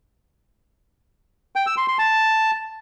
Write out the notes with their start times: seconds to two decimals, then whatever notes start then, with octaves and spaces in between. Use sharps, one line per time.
1.56 G5
1.66 E6
1.77 C6
1.88 C6
1.99 A5